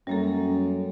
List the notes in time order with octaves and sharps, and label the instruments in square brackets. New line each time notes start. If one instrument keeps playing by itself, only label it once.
[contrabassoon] F#2 [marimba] G3 A#3 A4